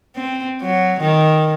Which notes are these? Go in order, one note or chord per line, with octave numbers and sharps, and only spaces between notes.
C4
F#3
D#3